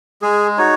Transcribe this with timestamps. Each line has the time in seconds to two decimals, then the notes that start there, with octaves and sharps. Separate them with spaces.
0.22 G#3 G#4
0.58 D#4 F#4 C#5